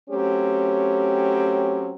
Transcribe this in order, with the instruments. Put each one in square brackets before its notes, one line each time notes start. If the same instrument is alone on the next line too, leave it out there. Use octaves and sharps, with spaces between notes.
[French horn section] F#3 A3 C4 C#4 G4